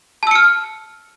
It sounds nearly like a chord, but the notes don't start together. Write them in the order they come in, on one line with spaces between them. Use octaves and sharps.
A5 E6 C#7 F6